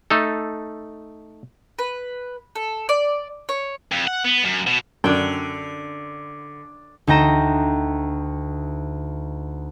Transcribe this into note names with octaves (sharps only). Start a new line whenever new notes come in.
A3 D#4 A4
B4
A4
D5
C#5
F2
F#5
B3
F#2
B2
F#2 D3 D4 G5
D2 D#4 G5 A#5 D#7 E7